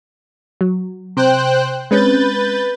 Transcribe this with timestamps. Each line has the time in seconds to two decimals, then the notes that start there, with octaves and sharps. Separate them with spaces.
0.61 F#3
1.17 C3 C5 G5 F#6
1.91 G#3 C4 C#4 B4 G6 A6